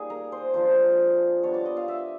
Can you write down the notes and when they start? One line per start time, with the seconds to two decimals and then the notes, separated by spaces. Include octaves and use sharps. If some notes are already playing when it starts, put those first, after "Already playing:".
Already playing: G3 A#3 D#4 G#4
0.10 A#4
0.32 C5
0.54 F3 A#3 D4 F4 C5
1.43 G3 B3 D4 F4 C#5
1.54 D5
1.66 D#5
1.77 F5
1.88 E5